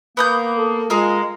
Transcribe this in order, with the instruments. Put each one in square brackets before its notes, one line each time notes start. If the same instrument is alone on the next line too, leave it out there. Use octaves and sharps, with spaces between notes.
[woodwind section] A#3 [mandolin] B3 D#6 G6
[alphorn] A4
[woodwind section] G#3 [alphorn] F4 [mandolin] G#4 A#4 F5